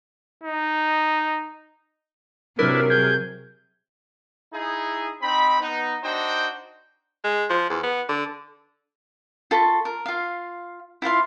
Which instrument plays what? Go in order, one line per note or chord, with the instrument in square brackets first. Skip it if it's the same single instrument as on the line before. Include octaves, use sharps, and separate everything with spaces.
[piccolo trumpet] D#4
[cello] C3 F#3 [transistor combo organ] D4 E4 B4 [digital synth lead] A#4
[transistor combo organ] G#4 [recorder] G6
[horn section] D#4 E4 G#4
C4 D#4 B5
B3 D#4
D4 D#4 F#4 C5 G5
[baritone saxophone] G#3
F3
E2
B3
D3
[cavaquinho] F4 A4 B5 C#6
A#4
F4 F5
E4 F4 F5 C6